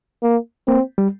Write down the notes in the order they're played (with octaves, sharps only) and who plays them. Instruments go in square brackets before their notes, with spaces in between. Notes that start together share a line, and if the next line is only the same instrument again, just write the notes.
[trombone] A#3
[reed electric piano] A#3 [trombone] C4
[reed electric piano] G3